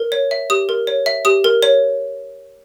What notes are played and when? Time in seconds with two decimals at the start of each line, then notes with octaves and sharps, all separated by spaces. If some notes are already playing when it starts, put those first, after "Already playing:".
Already playing: A#4
0.12 C#5
0.31 E5
0.50 G4 D#6
0.69 A#4
0.87 C#5
1.06 E5
1.25 G4 D#6
1.44 A#4
1.63 C#5